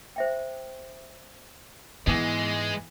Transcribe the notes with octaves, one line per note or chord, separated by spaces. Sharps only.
C5 E5 G5
G#2 E3 G#3 B3